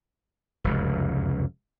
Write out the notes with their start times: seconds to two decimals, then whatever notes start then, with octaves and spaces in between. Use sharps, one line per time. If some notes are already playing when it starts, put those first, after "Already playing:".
0.64 F1 C#2 F#2